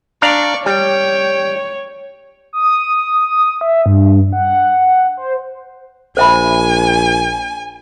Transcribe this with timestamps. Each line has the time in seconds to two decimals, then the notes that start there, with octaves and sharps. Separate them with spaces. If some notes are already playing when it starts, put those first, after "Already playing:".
0.22 D4 D5 F5 A#5 C#6
0.66 G3 C#5 G5
2.53 D#6
3.61 E5
3.86 G2
4.33 F#5
5.17 C5
6.17 A#1 C5 E5 G#5 B5